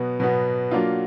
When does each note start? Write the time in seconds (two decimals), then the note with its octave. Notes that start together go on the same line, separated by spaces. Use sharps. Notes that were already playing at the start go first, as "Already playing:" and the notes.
Already playing: B2 F#3 B3
0.20 B2 F#3 B3
0.71 F#3 A#3 D4 F4